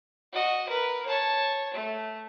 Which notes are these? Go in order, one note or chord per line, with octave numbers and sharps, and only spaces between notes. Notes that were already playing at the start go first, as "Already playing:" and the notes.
F#4 D#5
A#4 B4
C#5 A5
A3